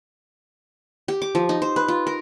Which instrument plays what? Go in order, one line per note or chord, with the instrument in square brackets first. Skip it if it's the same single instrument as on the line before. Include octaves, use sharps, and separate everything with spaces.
[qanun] G4
D6
F3
D#4
C5
B4
F4
A#4